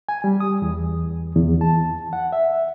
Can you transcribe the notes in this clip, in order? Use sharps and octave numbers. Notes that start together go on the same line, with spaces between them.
G#5
G3
D#6
E2
E2
A5
F#5
E5